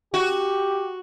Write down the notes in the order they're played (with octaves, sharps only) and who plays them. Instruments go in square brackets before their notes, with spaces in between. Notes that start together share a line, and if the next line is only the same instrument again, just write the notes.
[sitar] F#4 [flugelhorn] G4